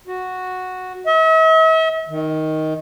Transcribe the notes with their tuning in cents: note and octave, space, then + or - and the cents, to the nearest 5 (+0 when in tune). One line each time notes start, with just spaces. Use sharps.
F#4 -5
E5 -45
D#3 +10